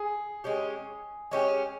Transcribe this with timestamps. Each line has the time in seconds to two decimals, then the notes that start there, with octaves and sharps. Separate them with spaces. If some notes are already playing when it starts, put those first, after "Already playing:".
Already playing: G#4
0.44 G#3 C#4 G4
1.31 G#3 C#4 G4